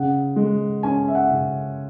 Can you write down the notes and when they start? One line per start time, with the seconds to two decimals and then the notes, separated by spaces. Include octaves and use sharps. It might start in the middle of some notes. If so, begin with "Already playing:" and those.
Already playing: C#3 F#5
0.36 G#3
0.83 C#4 G#5
1.08 E5
1.15 F#5
1.31 C#3